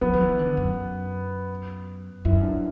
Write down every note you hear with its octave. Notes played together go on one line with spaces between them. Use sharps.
F#3 B3
F#3
E3
D3
F#2
F#2 E4
D4